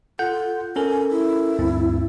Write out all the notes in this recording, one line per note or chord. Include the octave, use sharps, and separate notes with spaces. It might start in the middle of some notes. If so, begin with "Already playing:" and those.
F4 A4 F#5 G6
C#4 A4 A#4 G#5
E4
D2 G2 C4